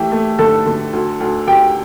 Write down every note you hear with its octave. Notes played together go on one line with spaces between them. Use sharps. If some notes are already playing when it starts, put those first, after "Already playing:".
Already playing: E3 A3 G4 G5
A3
D3 A4 A5
D3
D2
D2
D2 G4 G5